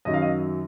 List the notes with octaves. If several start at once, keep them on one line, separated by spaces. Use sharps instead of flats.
F#2 D#3 F#3 D#5
F5
D#5